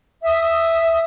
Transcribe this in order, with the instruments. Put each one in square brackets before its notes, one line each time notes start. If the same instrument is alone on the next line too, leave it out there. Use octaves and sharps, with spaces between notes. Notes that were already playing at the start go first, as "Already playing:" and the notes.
[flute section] E5 D#6